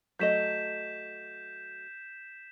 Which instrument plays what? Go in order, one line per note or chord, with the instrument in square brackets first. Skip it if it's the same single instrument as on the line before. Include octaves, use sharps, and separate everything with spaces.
[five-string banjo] F#3 A3 D#5 [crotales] G6 B6 E7